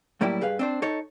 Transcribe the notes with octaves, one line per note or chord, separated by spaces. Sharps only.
A2 F#3 G3 A#3 E4 G4
G2 G#4 B4 F5
C4 D4 C5
D#4 A4 C#5